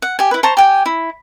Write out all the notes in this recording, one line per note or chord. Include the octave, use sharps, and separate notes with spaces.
F#5
G4 G#5
E4 B4
C5 A5 A#5 C#6
G4 G5 G#5
E4